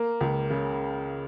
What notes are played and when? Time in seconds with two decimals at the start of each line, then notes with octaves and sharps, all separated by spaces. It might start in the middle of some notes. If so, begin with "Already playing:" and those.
Already playing: A#3
0.21 C#2
0.50 C#3